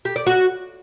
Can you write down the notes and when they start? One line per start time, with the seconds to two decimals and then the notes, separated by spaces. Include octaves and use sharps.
0.05 G4
0.16 D5
0.27 F#4